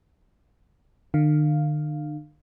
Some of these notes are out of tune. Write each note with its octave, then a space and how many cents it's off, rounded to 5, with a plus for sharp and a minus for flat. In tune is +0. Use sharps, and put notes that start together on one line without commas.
D3 +45 F5 +0